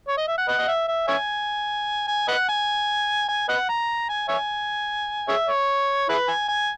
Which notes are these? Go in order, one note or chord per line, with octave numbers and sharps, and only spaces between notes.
C#5
D#5
E5
F#5
B4 D#5 F#5
D#5
E5
E5
C#5 E5 G#5
G#5
B4 D#5 F#5
G#5
G#5
B4 D#5 F#5
A#5
G#5
C#5 E5 G#5
G#4 C#5 E5
C#5
E4 G#4 B4
G#5
G#5